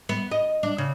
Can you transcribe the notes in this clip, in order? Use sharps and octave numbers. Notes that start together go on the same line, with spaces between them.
B3
D#5
D4
C#3